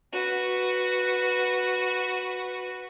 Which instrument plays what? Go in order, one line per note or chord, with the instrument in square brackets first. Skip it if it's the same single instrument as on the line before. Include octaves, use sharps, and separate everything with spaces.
[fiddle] F#4 B4